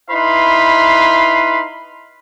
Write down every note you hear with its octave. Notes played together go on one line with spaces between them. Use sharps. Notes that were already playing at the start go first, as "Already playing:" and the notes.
D#4 E4 B4 F5 B5 C6